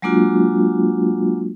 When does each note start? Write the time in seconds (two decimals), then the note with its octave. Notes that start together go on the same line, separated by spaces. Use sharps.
0.02 F#3 G#3 A#3 D4 F4 F#4